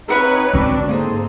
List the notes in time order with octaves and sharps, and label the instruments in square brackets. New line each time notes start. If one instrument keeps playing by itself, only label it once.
[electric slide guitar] C4 E5 F#5 [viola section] D#4 B4 C#5
[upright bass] G#2 D3 [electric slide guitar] C4 F#4 [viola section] D4
[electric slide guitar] A#3 G#4 A4 [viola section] C4 D#4